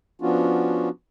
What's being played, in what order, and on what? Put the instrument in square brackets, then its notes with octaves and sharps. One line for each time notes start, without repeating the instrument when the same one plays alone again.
[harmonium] F3 B3 C#4 D4 F4 F#4